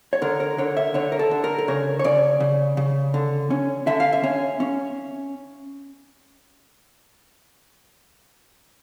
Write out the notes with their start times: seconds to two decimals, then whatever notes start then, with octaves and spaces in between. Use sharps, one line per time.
0.13 C#5
0.22 D3 A#4
0.40 A#4
0.58 D3 C#5
0.77 E5
0.94 D3 C#5
1.12 A#4
1.19 A4
1.31 D3
1.44 A#4
1.59 A#4
1.68 C#3 C#5
1.99 C#5
2.04 C#3 D5
2.40 C#3
2.77 C#3
3.14 D3
3.50 C#4
3.87 D3 E5
4.00 F5
4.13 E5
4.24 C#4
4.60 C#4